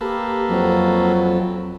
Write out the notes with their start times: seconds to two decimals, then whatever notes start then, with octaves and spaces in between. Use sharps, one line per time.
0.01 A#3 G4 A4 B4
0.49 F2 F#3